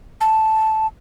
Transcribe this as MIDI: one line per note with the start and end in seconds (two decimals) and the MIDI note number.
0.21 0.87 81